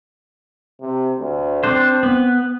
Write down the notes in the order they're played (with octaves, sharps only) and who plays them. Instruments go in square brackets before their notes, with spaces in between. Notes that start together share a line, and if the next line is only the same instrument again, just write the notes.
[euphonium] C3
D2
[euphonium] C4 [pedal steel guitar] D4 C5
[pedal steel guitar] B3